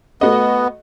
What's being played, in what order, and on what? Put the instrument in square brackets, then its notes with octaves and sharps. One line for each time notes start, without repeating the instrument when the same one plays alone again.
[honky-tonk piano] A3 F#4 D#5 [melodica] B3